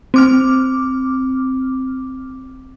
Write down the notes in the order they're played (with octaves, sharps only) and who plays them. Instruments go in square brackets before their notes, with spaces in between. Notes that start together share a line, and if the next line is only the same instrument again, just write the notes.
[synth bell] C4 D6 F6